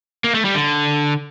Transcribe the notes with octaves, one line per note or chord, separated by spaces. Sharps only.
A#3
A3
G3
D3